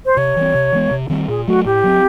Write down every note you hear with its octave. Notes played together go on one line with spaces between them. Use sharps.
C5
C3 C#5
E3 G3 C4
C3
E3 G#3 B3
C3
D#3 G3 C4
A#2 G#4
F#3 A3 F#4
A2 G4
F#3 A3 C4